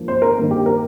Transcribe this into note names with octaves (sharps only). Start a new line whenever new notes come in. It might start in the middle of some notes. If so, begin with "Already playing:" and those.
Already playing: G2 F3 A#3
C5
A#4
G2 D#3 A#3
G4
A#4